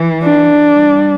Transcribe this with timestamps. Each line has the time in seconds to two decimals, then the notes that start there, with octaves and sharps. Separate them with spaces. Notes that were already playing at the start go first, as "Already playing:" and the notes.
Already playing: E3
0.23 D4
0.76 G3